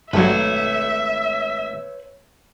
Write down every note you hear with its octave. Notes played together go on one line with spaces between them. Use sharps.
G#1 G2 F#3 A3 B4 C#5 E5